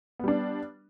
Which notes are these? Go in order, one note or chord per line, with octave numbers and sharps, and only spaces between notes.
G3 B3 D4